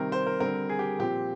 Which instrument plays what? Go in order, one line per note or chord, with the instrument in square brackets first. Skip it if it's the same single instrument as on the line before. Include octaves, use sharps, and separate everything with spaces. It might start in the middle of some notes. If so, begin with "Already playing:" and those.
Already playing: [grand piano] C3 D#3 G3 C4 A#4
C5
A#4
D3 G3 C4 A#4
G#4
G4
A#2 F3 C4 G4